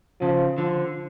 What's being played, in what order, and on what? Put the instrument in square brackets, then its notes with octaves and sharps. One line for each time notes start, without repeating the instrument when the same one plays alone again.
[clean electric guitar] C#3 [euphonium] F3
[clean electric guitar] D3 [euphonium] F3